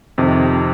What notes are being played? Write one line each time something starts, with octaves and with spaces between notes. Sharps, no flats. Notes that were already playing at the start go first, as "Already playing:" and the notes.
F2 C3 D#3